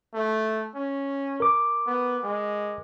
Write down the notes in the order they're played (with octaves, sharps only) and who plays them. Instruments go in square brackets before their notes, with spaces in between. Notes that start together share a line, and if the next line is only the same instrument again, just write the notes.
[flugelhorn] A3
C#4
[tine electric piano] A#4 D6
[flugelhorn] B3
G#3